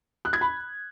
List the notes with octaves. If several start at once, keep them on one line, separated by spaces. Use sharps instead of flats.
F#6
G#6
B5